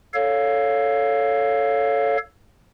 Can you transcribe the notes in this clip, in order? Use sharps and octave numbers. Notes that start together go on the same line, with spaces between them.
A4 C#5 F5